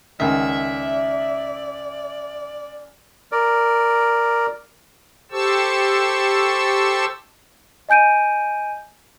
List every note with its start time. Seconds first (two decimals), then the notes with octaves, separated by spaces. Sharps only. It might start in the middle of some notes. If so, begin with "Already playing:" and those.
0.20 C#2 D#3 D5 E5
3.32 A#4 D5
5.32 G4 A4 C5 A5 C#6 E6
7.89 D#5 G#5 G6 D7 D#7